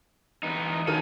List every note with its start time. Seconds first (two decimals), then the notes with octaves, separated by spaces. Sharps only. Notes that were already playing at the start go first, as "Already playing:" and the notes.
0.43 E2 B3 D#4
0.87 D#3 C#4 A4 F6 D#7